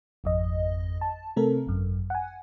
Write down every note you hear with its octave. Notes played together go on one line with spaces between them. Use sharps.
G#1 F2 D#5
A5
C3 A3 C4 A4 A#4
G#1 F#2
F#5 G#5